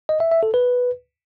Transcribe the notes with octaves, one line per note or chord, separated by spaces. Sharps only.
D#5
E5
E5
A4
B4